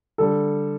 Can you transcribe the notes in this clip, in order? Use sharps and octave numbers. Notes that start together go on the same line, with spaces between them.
D3 G3 A4